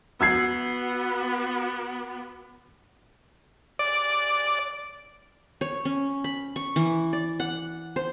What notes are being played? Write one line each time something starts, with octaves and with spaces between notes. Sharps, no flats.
B3 F#4 E6 G#6 C7
D5
C#5
C#4
B5
C#6
E3
D5
F#5
C5